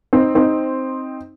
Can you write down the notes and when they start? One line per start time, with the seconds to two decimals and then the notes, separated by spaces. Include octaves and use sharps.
0.13 C4 D#4
0.35 C4 D#4